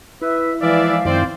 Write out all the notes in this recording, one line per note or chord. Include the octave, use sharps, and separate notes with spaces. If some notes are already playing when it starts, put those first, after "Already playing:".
E4 B4 E5
E3 F3 G#3 D5 E5 F5
F#2 D#3 C4 E4 C5 D5